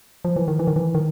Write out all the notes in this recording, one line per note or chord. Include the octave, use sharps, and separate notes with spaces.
F3
E3
D#3
E3
D#3
E3
D#3